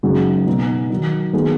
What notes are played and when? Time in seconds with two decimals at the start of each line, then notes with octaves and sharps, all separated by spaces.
0.03 F#2 C#3 G#3 D#4 F#4
0.47 B2 B3 D#4
0.90 D#3 F#3 D#4
1.33 D#3 F#3 B3 G#4